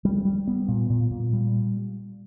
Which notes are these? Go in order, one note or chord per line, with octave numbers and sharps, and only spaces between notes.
G3
G3
B3
A#2
A#2
A#2
G3